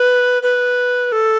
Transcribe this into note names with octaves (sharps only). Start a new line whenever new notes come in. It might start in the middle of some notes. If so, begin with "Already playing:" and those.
Already playing: B4
B4
A4